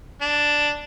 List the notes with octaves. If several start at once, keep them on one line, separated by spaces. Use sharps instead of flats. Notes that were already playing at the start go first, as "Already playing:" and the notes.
D4